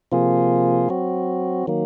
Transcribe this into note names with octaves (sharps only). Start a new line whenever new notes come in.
C3 F3 A#3 F4 G#4
F#3 C4 F#4
D#3 F#3 A#3